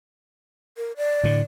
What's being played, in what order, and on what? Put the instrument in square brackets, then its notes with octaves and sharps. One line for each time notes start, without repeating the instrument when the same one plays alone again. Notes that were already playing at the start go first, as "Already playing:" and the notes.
[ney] A#4
D5
[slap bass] A2 D3